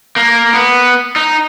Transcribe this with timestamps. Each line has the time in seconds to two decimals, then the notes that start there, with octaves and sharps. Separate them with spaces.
0.16 A#3
0.53 B3
1.16 D#4